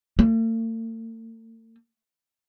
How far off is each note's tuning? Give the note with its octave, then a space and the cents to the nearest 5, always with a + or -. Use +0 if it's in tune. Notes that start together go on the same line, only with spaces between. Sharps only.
A3 +45